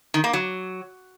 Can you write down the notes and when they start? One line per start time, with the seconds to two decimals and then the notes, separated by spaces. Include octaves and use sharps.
0.14 D#3
0.24 A#3
0.33 F#3